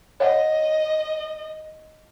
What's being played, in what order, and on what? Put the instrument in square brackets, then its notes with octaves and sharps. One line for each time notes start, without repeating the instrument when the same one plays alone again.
[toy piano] C#5 F5 F#5 [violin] D#5